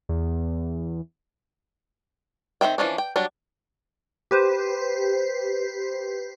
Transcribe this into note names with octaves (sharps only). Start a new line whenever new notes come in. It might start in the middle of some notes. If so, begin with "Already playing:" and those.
E2
D#3 C4 E5 G5
E3 F3 C#4 D4
G5
F#3 G3 D4
G4 B4 C5